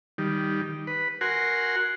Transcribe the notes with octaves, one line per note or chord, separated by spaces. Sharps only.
D#3 G3
B4
F#4 A#4 F#5 G#5 C6